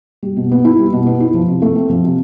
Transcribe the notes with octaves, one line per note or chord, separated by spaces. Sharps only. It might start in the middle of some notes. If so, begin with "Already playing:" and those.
G3
B2
B3
E4
G3
B2
B3
E4
F3
C3
A3
C4
F3
C3